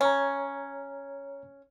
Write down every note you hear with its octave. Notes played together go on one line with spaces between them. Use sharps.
C#4 C#5 A#5